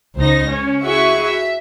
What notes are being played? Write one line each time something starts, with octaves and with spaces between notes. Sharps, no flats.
C#2 D#4 C5 A#6
C#4
E4 F#4 G#4 E5 C#6
E5